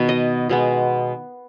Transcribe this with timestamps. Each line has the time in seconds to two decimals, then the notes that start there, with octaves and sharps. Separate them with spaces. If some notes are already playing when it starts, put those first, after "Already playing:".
Already playing: B2 D#3 B3
0.09 D#5
0.49 B2 G#3 B3